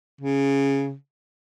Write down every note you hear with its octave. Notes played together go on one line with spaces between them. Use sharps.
C#3